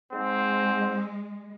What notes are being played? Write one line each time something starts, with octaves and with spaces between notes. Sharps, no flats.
G#2 G#3 C4